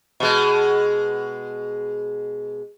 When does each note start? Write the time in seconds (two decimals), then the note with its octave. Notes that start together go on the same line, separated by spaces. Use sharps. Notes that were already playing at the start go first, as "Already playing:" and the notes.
0.20 B2 G#3